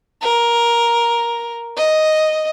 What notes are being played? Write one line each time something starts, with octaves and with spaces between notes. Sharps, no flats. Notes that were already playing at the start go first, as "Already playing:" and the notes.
A#4
D#5